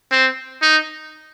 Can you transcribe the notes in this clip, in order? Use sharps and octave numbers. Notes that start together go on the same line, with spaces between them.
C4
D#4